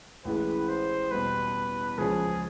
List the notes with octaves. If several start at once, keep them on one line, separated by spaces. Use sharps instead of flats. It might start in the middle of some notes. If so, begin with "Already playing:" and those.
A1 A2 E3 G#3 B4
C5
E2 B2 G3 B4
C#2 C#3 F3 G#3 C#4 G#4